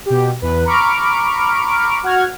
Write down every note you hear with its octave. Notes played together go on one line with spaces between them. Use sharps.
B2 G4
E2 B4
A#5 B5 C#6 D6 F6 D7
F#4 F#5 F6 G#6